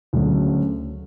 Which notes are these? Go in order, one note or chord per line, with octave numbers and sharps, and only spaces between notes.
D2 C#3 F#3 A3